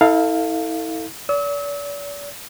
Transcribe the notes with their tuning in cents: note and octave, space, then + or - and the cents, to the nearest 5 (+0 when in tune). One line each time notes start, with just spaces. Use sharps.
E4 -35 A4 +20 F5 +0
D5 -40 E6 -40